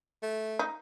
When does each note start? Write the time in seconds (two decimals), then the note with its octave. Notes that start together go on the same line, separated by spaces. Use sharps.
0.23 A3
0.59 D#4